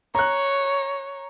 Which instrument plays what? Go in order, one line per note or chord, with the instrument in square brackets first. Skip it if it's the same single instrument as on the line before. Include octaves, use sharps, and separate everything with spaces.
[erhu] C#5 [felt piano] A#5 F#6